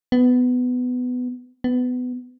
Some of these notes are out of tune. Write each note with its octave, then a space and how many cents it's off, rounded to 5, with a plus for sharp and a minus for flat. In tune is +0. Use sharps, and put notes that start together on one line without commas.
B3 +15
B3 +20